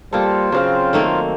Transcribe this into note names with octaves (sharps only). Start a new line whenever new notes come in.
G3 A#3 F4 A4 C5
C#3 F#3 C4 F5
D#3 A3 A#3